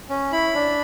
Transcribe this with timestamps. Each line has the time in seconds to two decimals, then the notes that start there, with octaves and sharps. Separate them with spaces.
0.09 C#4
0.32 E4 B5
0.55 D4